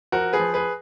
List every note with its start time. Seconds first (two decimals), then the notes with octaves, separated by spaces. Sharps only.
0.12 F3 F#4 A#4
0.33 G#4 B4
0.39 F3
0.54 G#4 B4